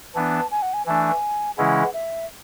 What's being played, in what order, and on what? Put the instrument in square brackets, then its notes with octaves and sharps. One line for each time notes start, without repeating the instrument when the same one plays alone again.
[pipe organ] E3 B3 D4 [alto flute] A5
[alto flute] G#5
F#5
G#5
[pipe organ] E3 A3 D4 [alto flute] G#5
[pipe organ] C#3 E3 G#3 C#4 E4 [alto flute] F#5
[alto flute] E5